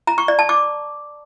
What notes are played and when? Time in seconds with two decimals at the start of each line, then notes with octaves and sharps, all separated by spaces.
0.07 A#5
0.18 C#6
0.28 D5
0.39 A5
0.49 D6